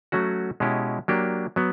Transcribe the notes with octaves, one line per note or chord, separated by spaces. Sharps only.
F#3 A3 C#4 F#4
B2 G#3 C#4 E4 G4
F#3 A#3 D4 G4
F#3 B3